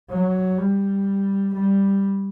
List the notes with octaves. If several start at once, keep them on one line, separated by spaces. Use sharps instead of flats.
F#3
G3
G3